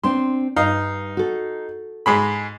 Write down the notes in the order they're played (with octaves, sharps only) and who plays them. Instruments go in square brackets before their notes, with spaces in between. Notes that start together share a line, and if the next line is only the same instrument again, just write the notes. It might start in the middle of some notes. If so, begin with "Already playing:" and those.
[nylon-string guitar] C4 D4 C5 [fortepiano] C6
[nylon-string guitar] G2 [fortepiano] D#4 F5
[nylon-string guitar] F#4 A4
[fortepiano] G#2 G#3 B5